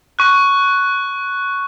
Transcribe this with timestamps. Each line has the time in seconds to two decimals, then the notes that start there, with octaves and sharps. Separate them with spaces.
0.19 C#6 F#6